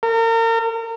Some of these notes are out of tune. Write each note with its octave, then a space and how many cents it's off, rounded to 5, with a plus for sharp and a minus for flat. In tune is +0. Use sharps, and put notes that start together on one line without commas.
A#4 -35